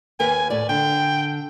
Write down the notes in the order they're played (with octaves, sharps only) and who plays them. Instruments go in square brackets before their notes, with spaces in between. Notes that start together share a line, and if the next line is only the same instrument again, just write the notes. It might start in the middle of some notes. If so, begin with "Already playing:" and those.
[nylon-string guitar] D#2 A#4 B4 [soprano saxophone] G#5
[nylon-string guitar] A2 A3 [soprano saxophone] D5
[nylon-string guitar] D3 [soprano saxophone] G5